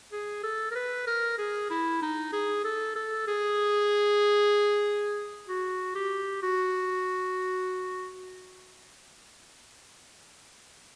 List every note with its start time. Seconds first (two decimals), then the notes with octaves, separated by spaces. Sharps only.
0.12 G#4
0.44 A4
0.71 A#4
0.75 B4
1.07 A#4
1.38 G#4
1.71 E4
2.02 D#4
2.33 G#4
2.64 A4
2.96 A4
3.28 G#4
5.48 F#4
5.95 G4
6.42 F#4